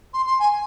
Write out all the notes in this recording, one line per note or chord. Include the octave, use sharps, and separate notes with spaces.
C6
C6
G#5